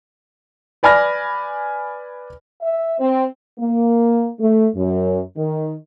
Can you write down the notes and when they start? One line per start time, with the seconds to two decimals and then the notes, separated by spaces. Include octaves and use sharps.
0.83 B4 D5 G#5 B5 F6 A#6
2.62 E5
3.00 C4
3.60 A#3
4.40 A3
4.76 F#2
5.37 D#3